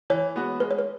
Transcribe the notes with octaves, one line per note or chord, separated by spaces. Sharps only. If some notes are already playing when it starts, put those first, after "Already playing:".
E3 C#5
G#3 B3 F#4
G#3 B4
C#5
B4